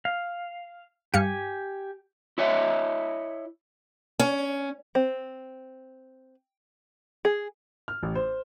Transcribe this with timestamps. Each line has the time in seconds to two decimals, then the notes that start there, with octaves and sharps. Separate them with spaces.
0.05 F5
1.14 G2 G4 F5 G#5 C#7
2.38 E4 C#5 D#5 E5
4.19 C#4
4.95 C4
7.25 G#4
7.88 F6
8.03 A1
8.15 C5